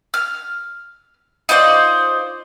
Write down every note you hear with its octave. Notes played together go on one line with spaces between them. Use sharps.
F6
D#4 F4 C5 D5